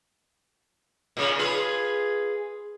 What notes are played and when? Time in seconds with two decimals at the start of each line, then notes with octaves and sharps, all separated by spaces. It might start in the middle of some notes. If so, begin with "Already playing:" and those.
1.17 A#2 C#3
1.39 F4 G#4 B4